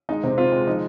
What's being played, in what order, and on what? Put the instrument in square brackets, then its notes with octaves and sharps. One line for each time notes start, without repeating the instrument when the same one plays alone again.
[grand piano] G#3 [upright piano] D#4
[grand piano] C3 [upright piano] C4
[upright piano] C4 [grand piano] F4
[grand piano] G#3
[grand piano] F3 [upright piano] D#4